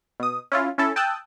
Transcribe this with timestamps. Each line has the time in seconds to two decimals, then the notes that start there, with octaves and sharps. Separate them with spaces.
0.20 B2 D#6
0.52 C#4 E4 F4
0.78 C#4 E4 A4
0.96 G5 A5 D#6 E6 F#6 G6